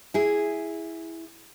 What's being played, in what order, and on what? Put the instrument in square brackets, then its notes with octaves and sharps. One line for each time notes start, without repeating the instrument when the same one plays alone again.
[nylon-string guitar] E4 G#4